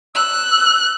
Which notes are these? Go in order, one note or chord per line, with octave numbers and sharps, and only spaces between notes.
E6 F#6